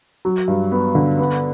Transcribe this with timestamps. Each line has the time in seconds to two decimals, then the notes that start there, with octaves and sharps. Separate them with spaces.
0.25 F#3
0.48 G2
0.72 B3
0.95 D3
1.19 B3